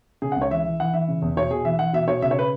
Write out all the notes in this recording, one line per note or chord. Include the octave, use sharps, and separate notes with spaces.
C#3 G#4
F#5
C#2
C#5
E3 E5
E3
E3 F#5
E3 E5
C#3
E2
B2 C#5
B2 G#4
E3 E5
E3 F#5
B2 E5
B2 C#5
C#3 E5
C#5
B4